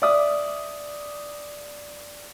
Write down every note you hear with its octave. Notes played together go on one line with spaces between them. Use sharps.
D5 E5 D6 D#6